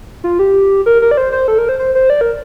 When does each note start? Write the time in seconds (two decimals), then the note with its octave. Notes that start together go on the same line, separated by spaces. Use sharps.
0.24 F4
0.39 G4
0.86 A#4
1.02 A#4
1.11 D5
1.17 C5
1.32 C5
1.48 A4
1.58 A#4
1.69 C5
1.79 C5
1.95 C5
2.10 D5
2.21 A#4